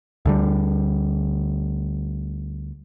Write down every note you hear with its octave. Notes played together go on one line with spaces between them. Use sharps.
D2 D3 G3